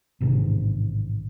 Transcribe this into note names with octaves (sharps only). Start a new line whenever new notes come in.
A1 G#2 C3 D#3